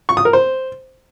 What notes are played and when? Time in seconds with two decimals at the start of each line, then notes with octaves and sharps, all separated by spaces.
0.09 C#6
0.17 D#6
0.25 A#4
0.33 C5